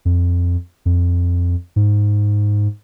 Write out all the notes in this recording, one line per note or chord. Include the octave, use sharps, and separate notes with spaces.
F2
F2
G#2